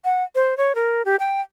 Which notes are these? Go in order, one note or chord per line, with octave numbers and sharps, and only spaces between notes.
F#5
C5
C#5
A#4
G4
G5